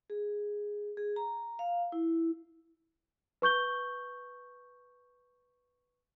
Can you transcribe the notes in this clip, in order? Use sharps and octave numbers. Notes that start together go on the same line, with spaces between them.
G#4
G#4
A#5
F5
E4
B4 C#6 G6 G7